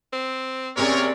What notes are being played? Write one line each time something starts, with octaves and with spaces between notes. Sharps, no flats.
C4
C3 A#3 C4 C#4 G#4 A#4 C#5 D5